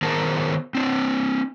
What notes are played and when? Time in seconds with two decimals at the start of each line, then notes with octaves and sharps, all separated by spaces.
0.02 D#3 B3 G#4 A#4 C5 A5
0.75 C4 D4